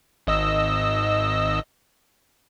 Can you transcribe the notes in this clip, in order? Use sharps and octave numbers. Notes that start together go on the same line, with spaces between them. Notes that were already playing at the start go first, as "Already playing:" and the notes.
G#1 D#5 E6